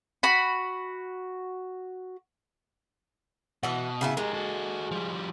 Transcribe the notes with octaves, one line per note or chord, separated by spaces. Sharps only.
F#4 B5
B2 E3 F#5
C#3 B3 E4
G#3 G4 A#4
F#4 A4
F3 G3